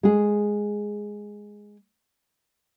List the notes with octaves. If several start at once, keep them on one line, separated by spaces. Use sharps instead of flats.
G#3 G#4